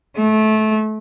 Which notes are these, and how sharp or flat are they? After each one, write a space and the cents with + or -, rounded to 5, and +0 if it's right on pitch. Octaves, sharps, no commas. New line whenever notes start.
A3 -25